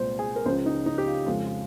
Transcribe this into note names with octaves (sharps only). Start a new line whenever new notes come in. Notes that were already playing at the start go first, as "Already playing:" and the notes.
Already playing: C2 A#2 G#3 C5
G#4
A#4
C#2 C#3 F3 C5
D#4
D#4
G4
F4
F2 C#3 F3 G#3 F4
F4